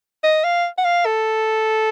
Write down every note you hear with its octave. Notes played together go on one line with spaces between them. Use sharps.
D#5
F5
F#5
F5
A4